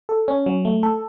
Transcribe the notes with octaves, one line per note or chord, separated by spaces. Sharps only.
A4
C#4
F#3
A3
A4